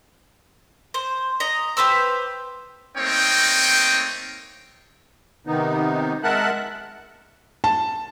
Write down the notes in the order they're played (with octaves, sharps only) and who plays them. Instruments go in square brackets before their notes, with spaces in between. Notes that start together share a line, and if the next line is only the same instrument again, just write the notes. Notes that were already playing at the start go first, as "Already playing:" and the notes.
[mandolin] C5
D#5 A#5
G4 B4 C5 E6
[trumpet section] A3 A#3 C4 D#4 C#5 G5
[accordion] C3 D#3 B3 D#4
G#3 A#4 E5 F#5 A5 F#6
[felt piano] A5